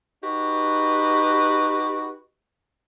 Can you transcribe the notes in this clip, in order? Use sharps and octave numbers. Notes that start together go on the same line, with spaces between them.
D#4 F#4 G4 B4